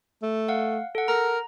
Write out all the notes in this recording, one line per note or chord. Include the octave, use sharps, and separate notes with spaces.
A3
F5 F#5
A4 F#5
A#4 A#5